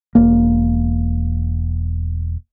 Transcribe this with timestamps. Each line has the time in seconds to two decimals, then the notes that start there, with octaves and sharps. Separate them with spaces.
0.15 E1 A#3